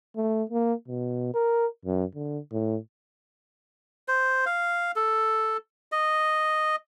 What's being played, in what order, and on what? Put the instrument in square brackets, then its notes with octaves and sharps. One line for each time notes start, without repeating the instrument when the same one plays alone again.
[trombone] A3
A#3
B2
A#4
F#2
D3
A2
[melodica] C5
F5
A4
D#5